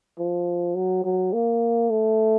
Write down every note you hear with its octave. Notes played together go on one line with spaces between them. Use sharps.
F3
F#3
F#3
A#3
A3